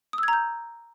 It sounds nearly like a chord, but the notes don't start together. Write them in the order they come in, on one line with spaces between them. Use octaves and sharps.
D#6 E6 G#6 A#5 G6